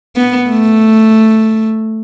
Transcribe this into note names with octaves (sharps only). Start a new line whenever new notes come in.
B3
A3